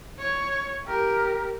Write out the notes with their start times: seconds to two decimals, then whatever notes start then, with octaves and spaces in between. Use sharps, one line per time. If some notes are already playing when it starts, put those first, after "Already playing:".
0.19 C#5
0.85 G4 A#4